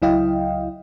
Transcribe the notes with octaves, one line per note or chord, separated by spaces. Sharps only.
C#2 F#3 E4 D#5 F5 G5